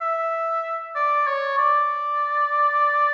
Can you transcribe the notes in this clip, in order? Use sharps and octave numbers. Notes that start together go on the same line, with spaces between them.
E5
D5
C#5
D5